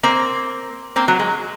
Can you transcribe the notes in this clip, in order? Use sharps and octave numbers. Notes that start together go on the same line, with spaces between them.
A#3 C4
A#3 C4
F#3
G#3